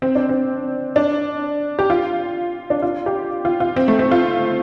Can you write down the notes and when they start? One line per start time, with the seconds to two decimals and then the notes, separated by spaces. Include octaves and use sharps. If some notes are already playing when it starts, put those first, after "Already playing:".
0.02 C4
0.15 D4
0.29 C4
0.96 D4
1.79 G4
1.90 F4
2.70 D4
2.82 F4
3.06 G4
3.45 F4
3.60 F4
3.76 C4
3.88 A3
3.99 C4
4.11 F4